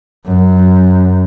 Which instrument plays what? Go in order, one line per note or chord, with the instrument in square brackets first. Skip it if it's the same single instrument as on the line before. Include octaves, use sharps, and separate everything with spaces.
[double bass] F#2